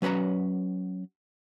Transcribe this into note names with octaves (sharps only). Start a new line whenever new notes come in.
F#3 C#4 B4 F#5 A#5